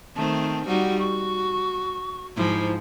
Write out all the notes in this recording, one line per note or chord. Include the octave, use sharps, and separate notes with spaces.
D#3 A3 C4 A5
G3 D#4 F#4 F#5
F#4 C#6
G#2 F3 E4